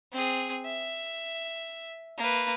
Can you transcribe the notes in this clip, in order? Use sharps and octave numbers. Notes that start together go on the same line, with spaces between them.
C4 G#4
E5
A#3 B4